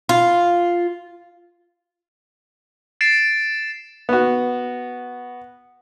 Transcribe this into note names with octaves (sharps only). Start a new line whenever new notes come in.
F4
A6 C7 D7 E7
B3 F#4